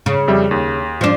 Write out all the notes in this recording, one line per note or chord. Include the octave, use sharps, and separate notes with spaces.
C#3
F2 G3 E5
D#2
F3 D4